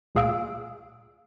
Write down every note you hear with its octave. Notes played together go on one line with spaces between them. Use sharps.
C#2 A#2 G#4 F5 E6 D7